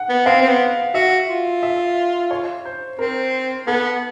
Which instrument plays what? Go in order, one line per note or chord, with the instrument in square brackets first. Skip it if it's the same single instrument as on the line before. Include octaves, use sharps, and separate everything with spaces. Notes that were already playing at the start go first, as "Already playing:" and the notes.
Already playing: [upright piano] F#5
[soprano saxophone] B3
[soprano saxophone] C4 [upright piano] F5
[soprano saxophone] C4
B3
[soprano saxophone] F#4 [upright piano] E5
[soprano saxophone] F4
[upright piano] E5
C#5
C5
[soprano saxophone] C4 [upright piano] A#4
[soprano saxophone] B3 [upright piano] A4